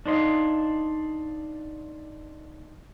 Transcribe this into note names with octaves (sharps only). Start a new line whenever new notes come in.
D4 D#4 C5 F5